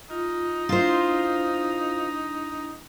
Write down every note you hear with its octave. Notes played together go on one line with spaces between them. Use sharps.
D#4 F4
D4 E4 F4 C5